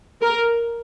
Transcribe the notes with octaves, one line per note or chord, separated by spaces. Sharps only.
A#4